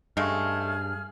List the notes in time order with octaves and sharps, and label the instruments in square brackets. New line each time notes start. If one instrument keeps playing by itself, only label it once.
[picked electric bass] G2 [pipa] C#3 G#3 A3 [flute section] G#4 F6